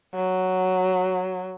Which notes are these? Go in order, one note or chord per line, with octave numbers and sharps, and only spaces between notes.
F#3